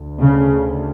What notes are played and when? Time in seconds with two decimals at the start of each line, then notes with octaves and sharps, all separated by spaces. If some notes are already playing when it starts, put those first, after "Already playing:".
Already playing: D2
0.21 C#3